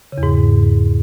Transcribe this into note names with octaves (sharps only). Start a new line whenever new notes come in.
C#3
E2
G#2